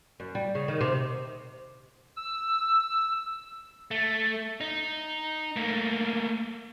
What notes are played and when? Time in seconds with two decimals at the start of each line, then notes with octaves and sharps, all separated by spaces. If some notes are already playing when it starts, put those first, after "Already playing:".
0.20 F#2
0.35 G3
0.55 C#3
0.68 D#3
0.81 C3
2.16 E6
3.91 A3
4.61 D#4
5.56 A3 A#3